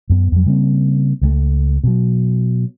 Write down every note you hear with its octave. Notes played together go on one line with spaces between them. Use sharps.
F#2 B3
F2 F#3
C#3 G3 A#3 C4
C#2 G3 A3
B2 F#3